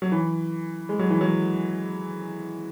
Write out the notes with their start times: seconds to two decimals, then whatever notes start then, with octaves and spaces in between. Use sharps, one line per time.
0.02 F#3
0.12 E3
0.89 G#3
0.99 F#3
1.10 E3
1.21 F#3